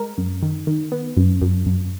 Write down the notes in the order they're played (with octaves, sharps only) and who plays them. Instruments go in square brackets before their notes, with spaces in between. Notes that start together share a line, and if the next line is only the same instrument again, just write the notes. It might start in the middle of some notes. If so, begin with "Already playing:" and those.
Already playing: [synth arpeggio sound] G#3 A#4
F#2
D#3
D#3
B3
F#2
F#2
F#2